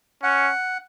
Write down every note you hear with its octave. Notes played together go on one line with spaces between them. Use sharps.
C#4 F#5